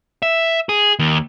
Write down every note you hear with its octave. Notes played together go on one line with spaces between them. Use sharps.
E5
G#4
D#2